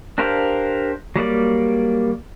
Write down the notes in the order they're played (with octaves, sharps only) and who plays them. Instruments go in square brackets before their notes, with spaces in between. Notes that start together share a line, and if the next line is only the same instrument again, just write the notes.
[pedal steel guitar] D4 G4 A#4 C5 F5
F#3 G3 A#3 D5